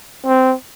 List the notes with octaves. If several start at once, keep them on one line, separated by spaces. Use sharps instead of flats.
C4